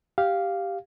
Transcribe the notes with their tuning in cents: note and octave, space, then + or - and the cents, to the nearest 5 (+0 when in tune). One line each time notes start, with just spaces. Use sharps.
G4 +0 F5 +0